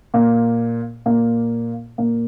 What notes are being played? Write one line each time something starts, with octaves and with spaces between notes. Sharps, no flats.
A#2 A#3
A#2 A#3
A#2 A#3